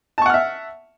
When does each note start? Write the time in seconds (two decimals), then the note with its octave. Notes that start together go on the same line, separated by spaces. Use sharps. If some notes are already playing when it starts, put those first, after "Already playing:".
0.18 A5
0.22 C#6
0.26 F#5
0.30 F6
0.34 E5